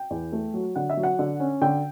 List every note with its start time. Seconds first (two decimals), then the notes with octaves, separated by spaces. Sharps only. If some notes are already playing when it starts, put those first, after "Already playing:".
Already playing: G5
0.10 E2
0.32 A3
0.54 F#3
0.75 D3 F#5
0.90 E5
0.97 F#3
1.03 F#5
1.19 D3
1.40 C#4
1.62 D3 G5